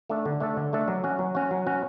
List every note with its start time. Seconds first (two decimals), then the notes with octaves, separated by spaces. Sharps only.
0.10 A3 D4 A4
0.25 D3
0.40 A3 D4 A4
0.57 D3
0.73 A3 D4 A4
0.88 F#3
1.04 C#4 F#4
1.19 F#3
1.35 C#4 F#4
1.51 F#3
1.67 C#4 F#4